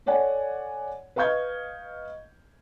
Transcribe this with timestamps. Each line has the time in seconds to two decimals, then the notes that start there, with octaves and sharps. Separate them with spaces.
0.06 A4 C#5 D5 F#5 G#5
1.16 B4 D#5 F5 C#6 G6 G#6